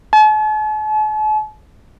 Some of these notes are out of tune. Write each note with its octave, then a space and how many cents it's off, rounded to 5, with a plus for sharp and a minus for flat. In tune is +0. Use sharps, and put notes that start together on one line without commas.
A5 -45